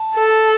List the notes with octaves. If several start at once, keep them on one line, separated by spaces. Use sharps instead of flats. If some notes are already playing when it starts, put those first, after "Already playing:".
Already playing: A5
A4